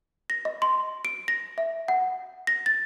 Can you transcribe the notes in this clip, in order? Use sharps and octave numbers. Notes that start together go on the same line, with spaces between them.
A#6
D#5
C6
D7
A#6
E5
F#5
A#6
A6